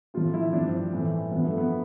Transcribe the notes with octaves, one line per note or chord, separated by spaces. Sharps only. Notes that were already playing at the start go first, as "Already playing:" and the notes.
A2 F3 F4
E4
G2 F3 D4
C4
A2 E3 C4
G2 F3 B3
A3
B3